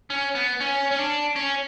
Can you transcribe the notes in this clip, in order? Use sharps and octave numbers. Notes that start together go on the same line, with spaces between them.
C#4
B3
C#4
C#4
D4
C#4